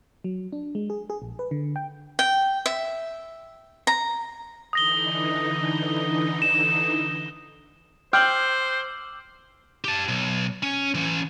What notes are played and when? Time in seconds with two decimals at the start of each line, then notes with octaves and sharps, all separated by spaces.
0.24 F#3
0.52 D4
0.75 G#3
0.90 G#4
1.10 G#4
1.22 A#1
1.39 B4
1.51 D3
1.76 G5
2.19 G5
2.66 E5
3.87 A#5
4.73 D3 E3 D#4 D#6 A#6 G7
6.42 E7
8.13 C5 G5 D6 E6 F6 G6 F#7
9.84 G4 A5
10.08 B1
10.63 C#4
10.95 E3 C#4